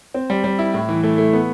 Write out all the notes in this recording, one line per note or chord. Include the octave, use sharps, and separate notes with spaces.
C4
G3
G3
E4
A2
E3
A3
A3
B3